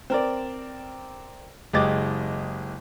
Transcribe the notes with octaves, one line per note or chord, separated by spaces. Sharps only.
C4 A#4 D5
F#1 G#3 G4 D#5 D6 A6